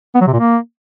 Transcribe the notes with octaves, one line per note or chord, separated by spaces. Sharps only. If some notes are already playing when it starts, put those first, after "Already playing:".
B3
F#3
C3
A#2
A#3